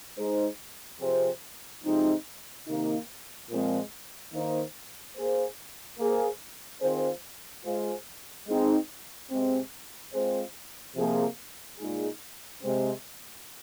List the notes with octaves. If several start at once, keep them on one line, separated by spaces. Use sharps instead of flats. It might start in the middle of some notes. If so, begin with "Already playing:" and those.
G#3 D#4 C5
C3 F3 C4 G#4 C5
C3 F3 G#3 C4 D#4
C3 D#3 A#3 D#4
A#2 F3 G#3 C4
D#3 A#3 D#4 C5
A#3 G#4 C5
A#3 G#4 C5
D#3 C4 F4 G#4 C5
G#3 F4 G#4 C5
G#3 C4 D#4
C3 G#3 C4
G#3 C4 F4 G#4 C5
C3 F3 A#3 G#4
A#2 G#3 D#4 G#4
C3 G#3 C4